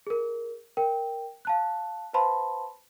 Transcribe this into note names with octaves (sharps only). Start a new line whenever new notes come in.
G#4 A#4
A#4 G5
F5 A5 F#6
B4 C5 F5 A5 B5 C6